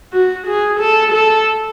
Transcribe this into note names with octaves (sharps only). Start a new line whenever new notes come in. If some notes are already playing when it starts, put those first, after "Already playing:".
F#4
G#4
A4
A4